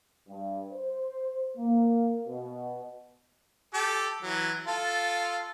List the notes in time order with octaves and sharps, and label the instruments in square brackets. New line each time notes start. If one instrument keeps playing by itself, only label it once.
[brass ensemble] G2
C5
A#3
B2
[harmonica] G4 A4
E3 F#3
F4 A4